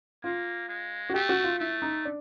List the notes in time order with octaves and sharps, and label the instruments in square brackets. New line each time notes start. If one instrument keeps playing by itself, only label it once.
[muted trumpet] A#3 [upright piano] F4
[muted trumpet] G#3
[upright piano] F#4
[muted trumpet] A3 [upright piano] G4
[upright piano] F#4
F4
[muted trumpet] A3 [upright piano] E4
[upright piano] D#4
D4